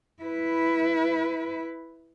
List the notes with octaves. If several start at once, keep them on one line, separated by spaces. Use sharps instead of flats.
E4 B4